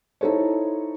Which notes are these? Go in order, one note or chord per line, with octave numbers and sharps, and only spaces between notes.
D#4 E4 A4 C5 C#5